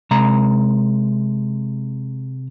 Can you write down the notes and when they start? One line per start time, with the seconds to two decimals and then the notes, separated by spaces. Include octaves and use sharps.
0.11 C3 G#3 A#5